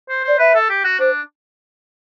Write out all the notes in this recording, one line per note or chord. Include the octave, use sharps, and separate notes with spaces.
C5
C5 D5
B4 E5
A4
G4
F#4
D4 C5